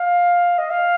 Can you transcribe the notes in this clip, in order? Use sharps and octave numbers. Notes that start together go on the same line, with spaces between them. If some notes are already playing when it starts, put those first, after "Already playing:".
Already playing: F5
D#5
F5